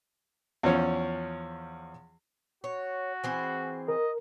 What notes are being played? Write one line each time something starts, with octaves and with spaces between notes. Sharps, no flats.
E2 F3 C#4 C#5
F#4 C#5
E3 C4 G#4
A#4 D#5